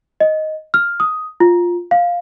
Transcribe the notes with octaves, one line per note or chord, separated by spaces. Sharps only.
D#5
F6
D#6
F4
F5